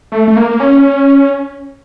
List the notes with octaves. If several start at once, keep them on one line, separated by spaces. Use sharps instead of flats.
A3
A3
A#3
A#3
C#4